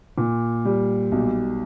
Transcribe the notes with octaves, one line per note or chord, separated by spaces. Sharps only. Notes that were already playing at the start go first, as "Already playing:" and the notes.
A#2
G3
B1